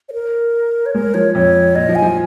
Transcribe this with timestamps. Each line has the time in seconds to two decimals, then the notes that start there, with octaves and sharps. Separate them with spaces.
0.09 C#5
0.13 A#4
0.86 C#5
0.94 G#3 A#4
1.14 F3 C#5
1.35 F2 C#5
1.75 A#2 D#5
1.89 F3
1.95 G#5
2.02 F3